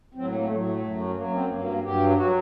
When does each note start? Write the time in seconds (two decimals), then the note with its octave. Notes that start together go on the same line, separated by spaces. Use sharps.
0.14 A2 F#3 C4
0.32 A#3
0.44 A3
0.49 A2 F#3
0.67 A3
0.82 F#2 F#3
1.16 F#3 A#3
1.20 F#2
1.27 A#3
1.33 C4
1.49 G2 F#3 A#3
1.83 G2 F#3 G4
2.16 F#3 F#4